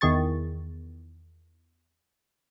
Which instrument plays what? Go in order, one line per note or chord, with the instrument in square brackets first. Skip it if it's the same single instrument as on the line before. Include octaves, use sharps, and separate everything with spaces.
[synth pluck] E2 D#3 G#4 C#6 A6